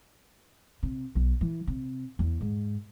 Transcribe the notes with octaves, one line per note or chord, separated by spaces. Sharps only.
C3
B1
E3
C3
E2
G#2